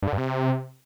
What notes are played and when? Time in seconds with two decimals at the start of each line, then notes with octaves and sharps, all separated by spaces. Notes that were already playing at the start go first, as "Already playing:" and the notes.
0.02 G2
0.08 D3
0.13 G2
0.18 C3